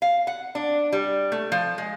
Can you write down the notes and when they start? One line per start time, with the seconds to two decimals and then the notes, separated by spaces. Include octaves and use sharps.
0.02 F5
0.27 F#5
0.55 D4
0.92 G3
1.32 A3
1.52 F3
1.78 G#3